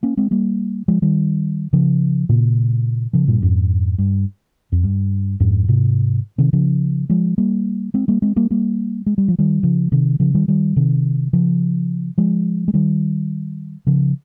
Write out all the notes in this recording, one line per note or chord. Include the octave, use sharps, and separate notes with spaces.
A#3 C#4
G#3 C4
G3 A#3
F3 G#3
D#3 G3
C#3 F3
A#2 C#3
C#3 F3
G2 A#2
F2 G#2
G2
F2
G2
F2 G#2
G#2 C3
C3 D#3
C#3 F3
F3 G#3
G3 A#3
G#3 C4
G3 A#3
G#3 C4
G3 A#3
G3 A#3
G#3
G3
F3
D#3 G3
C#3 F3
C3 D#3
C#3 F3
D#3 G3
D#3 G3
C3 D#3
C#3 F3
F3 G#3
G#3
D#3 G3
C#3 F3